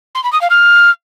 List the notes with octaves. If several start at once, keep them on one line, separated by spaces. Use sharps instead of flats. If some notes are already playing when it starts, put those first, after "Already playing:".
C6
B5
D#6
F5
F6